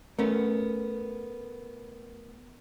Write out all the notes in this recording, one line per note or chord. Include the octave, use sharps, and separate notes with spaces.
A3 B3 C#4 A#4